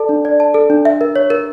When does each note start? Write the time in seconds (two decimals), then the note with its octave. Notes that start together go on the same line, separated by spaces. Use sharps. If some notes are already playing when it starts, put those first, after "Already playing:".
Already playing: A4 D5 A5
0.09 D4
0.25 D5
0.40 A5
0.54 A4
0.70 D4
0.85 E5
1.01 A#4
1.16 C#5
1.30 A#4